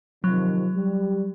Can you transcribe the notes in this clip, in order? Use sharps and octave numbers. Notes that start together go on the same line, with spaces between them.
C3 D#3 F3 F#3
G3